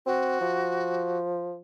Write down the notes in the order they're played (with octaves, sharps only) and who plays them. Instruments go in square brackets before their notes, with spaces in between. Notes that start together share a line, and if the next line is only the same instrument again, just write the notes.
[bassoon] C4 [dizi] F#4
[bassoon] F3